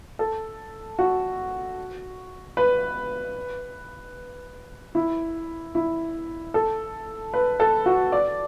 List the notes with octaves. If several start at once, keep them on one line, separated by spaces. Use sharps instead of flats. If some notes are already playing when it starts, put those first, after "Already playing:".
A4
F#4
B4
E4
E4
A4
B4
A4
F#4
D5